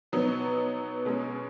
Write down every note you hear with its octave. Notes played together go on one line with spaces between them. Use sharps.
B2 F#3 B3 D#4
B2 G#3 C#4